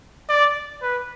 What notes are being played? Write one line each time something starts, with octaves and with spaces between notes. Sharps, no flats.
D5
B4